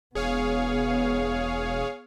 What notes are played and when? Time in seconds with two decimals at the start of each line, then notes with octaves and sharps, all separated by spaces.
0.15 E1 B3 G#4 C#5 F5